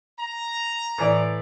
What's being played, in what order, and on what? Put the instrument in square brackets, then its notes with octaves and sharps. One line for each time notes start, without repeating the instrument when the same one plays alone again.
[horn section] A#5
[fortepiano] A2 E3 D5